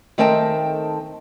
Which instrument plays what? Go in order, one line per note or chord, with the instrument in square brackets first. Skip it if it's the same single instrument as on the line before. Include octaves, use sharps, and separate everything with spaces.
[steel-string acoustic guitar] D#3 A3 C4 A#4 G5 A5